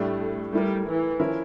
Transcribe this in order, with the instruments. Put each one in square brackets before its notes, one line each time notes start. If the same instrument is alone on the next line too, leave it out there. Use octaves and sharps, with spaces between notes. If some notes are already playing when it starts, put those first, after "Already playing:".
Already playing: [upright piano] A2 G3 D4 [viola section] A3
[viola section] G3 [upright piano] A3 E4 A#4
[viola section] E3
[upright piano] F3 C#4 E4 A#4